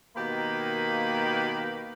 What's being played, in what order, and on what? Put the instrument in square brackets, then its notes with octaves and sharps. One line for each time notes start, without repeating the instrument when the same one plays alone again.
[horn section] B2 D#3 A#3 G4 B4 B5